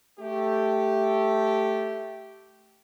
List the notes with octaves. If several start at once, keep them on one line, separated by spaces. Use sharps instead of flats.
A3 G4